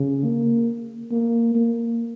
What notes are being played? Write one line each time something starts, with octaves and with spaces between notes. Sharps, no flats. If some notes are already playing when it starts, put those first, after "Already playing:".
Already playing: C#3
A#3
A#3
A#3